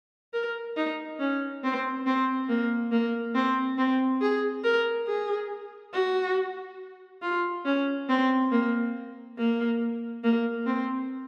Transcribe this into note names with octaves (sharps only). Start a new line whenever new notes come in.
A#4
D#4
C#4
C4
C4
A#3
A#3
C4
C4
G#4
A#4
G#4
F#4
F4
C#4
C4
A#3
A#3
A#3
C4